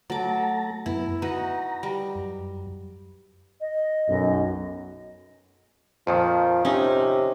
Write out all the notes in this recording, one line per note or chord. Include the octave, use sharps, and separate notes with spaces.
F#3 A3 A5 A#5 D6
F#2 B3 E4
D#4 F#4 B4 A#5
G3
F#2
D#5
B1 F#2
F2 A#2 D#3 F3
C3 C#4 D#4